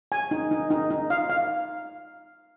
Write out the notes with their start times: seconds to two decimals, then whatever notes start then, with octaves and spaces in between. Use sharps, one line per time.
0.12 G#5
0.31 D#4
0.51 D#4
0.71 D#4
0.91 D#4
1.10 F5
1.30 F5